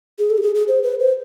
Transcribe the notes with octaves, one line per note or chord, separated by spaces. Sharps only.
G#4
A4
G4
G#4
G#4
C5
B4
C5